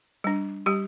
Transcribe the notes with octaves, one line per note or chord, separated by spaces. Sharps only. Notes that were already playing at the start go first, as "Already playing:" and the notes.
G3 D4
G3 G4